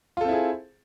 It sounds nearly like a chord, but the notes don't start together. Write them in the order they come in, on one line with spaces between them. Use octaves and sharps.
F4 A4 C4 E4 G#4